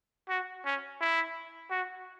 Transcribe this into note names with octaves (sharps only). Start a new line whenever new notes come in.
F#4
C#4
E4
F#4